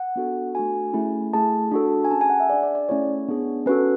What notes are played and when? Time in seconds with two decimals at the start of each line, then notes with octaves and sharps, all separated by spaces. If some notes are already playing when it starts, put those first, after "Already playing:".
Already playing: F#5
0.16 B3 D4 F#4 A4
0.55 A3 D4 F#4 A4 G#5
0.93 A3 C#4 E4 G#4
1.33 A3 E4 G#4 A5
1.72 D4 F#4 A4
2.05 G#5
2.10 C#4 G#4 A5
2.21 G#5
2.30 F#5
2.40 E5
2.49 D4 G#4 D5
2.63 D5
2.75 D5
2.89 A3 C#4 E4 G#4 C#5
3.28 B3 D4 G#4
3.66 C#4 F#4 A4 B4